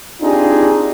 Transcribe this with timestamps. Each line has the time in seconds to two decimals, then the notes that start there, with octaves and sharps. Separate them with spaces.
0.21 C4 D4 D#4 F4 G4 G#4